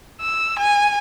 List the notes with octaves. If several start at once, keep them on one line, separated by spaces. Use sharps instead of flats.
E6
G#5